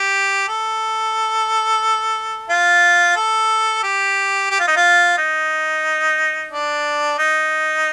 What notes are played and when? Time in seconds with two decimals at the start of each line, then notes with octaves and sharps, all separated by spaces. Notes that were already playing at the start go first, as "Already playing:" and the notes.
Already playing: G4
0.49 A4
2.50 F4
3.17 A4
3.84 G4
4.51 G4
4.60 F4
4.67 D#4
4.77 F4
5.18 D#4
6.52 D4
7.19 D#4